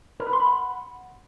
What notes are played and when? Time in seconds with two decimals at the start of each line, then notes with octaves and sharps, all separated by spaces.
0.20 A#4
0.26 B4
0.33 C6
0.40 B5
0.47 F#5